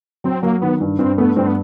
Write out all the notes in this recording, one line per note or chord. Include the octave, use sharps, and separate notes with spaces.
F#3 C4
F#3 A#3
D#3 B3
G2
G2 C4
A3 B3
G2 C4
B3